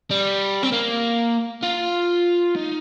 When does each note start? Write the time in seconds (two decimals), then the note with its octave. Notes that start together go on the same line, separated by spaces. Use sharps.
0.11 G3
0.63 C4
0.72 A#3
1.63 F4
2.56 D#4